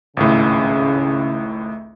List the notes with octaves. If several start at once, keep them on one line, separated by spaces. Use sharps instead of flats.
G#1 C#2 A2 C#3